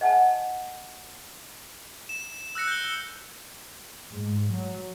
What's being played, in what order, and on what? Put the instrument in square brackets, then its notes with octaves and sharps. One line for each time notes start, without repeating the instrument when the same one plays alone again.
[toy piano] D#5 F#5 G#5 A5
[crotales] E7
E6 F#6 A#6 C#7
G6 G7
[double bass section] G#2
F#3